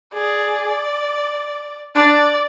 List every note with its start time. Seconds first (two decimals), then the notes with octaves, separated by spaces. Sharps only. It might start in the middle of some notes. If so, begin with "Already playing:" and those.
0.14 G#4 D5
1.96 D4 D5